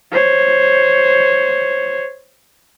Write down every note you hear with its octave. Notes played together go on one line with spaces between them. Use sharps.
C5 C#5